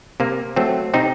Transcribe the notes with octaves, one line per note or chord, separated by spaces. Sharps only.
C3 A#3
F#3 A3 C4
C3 C4 D#4